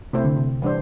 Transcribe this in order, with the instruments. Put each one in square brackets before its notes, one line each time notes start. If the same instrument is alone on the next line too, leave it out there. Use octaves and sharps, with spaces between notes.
[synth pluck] C3 [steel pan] A3 C4 E4 C5
[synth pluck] D3
C3
[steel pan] E3 G3 D4 C5